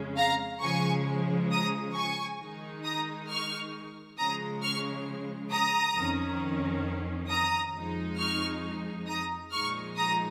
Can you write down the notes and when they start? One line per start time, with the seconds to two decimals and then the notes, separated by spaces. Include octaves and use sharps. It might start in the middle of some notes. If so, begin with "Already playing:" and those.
Already playing: F2 C#3 G#3 C#4
0.17 F5 A#5
0.62 C#3 F3 G#3 G#5 C#6
1.52 A#5 D#6
1.95 G#5 C#6
2.40 D#3 G#3 D#4
2.84 A#5 D#6
3.29 C#6 F6
4.18 C#3 F3 G#3 A#5 D#6
4.62 C#6 F6
5.52 A#5 D#6
5.95 F2 D#3 C#4
7.29 A#5 D#6
7.73 F2 F3 G#3 D#4
8.18 C#6 F6
9.07 A#5 D#6
9.52 A#2 F3 G#3 D#4 C#6 F6
9.97 A#5 D#6